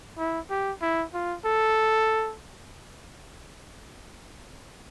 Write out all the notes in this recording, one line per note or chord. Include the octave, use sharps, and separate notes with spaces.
E4
G4
E4
F4
A4